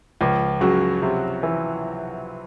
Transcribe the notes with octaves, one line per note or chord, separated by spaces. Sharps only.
C#2 F3 F4
C#3 F#3 F#4
C3
E3